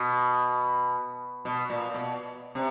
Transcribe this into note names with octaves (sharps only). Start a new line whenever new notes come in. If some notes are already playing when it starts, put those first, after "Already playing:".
Already playing: B2
B2
A#2
B2
C3